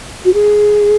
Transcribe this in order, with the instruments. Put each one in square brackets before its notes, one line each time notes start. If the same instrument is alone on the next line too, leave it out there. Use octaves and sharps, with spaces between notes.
[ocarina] F#4
G#4